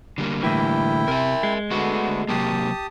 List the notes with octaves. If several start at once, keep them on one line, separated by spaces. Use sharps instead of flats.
D3 G3 A#3
A2 E3 E4 G5
C3 A#4 E5
G#3
D3 A3 B3 F#4
C3 F#3 A#3 G4 A5 D#6